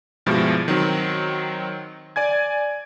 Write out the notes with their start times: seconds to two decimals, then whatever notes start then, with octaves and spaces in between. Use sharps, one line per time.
0.26 G2 B2 F3 G3 G#3 E4
0.68 D#3 F#3 C4
2.16 D5 G#5 G#6